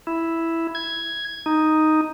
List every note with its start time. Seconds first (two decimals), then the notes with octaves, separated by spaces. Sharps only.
0.07 E4
0.75 G#6
1.46 D#4